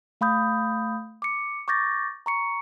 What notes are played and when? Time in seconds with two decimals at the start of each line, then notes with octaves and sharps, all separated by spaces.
0.21 A3 F5 B5 D#6 G6
1.22 D6 C#7
1.68 C#6 D6 G6 A6 A#6
2.26 A#5 C#6 C#7